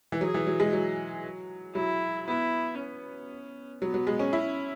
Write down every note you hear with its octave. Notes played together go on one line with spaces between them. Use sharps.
E3
F#3 G#4
E3
F#3
G#3
F#3
F#3 E4
B3 E4
C#4
F#3 B3
F#3
G#3
C#4
C#4 E4